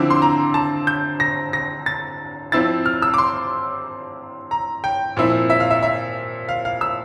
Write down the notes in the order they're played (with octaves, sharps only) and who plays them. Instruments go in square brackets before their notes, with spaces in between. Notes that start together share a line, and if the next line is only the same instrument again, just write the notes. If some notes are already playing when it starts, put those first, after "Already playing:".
Already playing: [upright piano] D3 F3 C4 E4 D6
C6
A#5
A5
G6
A#6
A#6
A6
F3 C4 E4 A6
F6
E6
D6
C6
A#5
G5
A#2 F3 C4 E4
E5
F5
E5
E5
F5
F5
E6